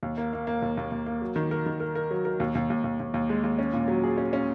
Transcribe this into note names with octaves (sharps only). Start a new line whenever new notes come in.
D#2
A#3
A#3
A#3
D#2
D#2
D#2
A#3
F#3
D#3
A#4
D#3
A#4
A#4
F#3
A#4
D#2
D#2
D#2
D#2
D#2
D#2
G#3
D#2
C#4
A#2
F#3
G#4
C#4
C#4